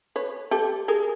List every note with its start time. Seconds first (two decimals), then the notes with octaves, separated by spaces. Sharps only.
0.16 B4 C#5
0.51 G4 A4
0.88 G#4 A#4